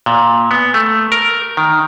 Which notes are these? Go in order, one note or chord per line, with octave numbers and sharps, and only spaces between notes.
A#2
B3
A3
A#4
D#3